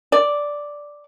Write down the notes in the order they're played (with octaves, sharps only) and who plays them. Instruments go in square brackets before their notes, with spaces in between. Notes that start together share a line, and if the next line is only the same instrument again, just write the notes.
[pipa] D5